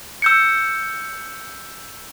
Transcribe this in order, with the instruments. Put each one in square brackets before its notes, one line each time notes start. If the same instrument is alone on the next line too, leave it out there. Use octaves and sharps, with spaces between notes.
[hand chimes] E6 G6 C#7